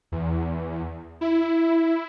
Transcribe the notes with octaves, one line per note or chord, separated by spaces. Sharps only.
E2
E4